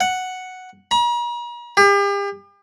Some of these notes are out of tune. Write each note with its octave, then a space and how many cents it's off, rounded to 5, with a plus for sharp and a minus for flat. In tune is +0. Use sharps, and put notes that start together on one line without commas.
F#5 +0
A#5 +45
G4 +40